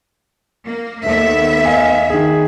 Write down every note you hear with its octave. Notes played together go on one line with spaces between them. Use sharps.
A#3
D#2 B3 A4 E5
D#5 F5 G#5
D#3 G#4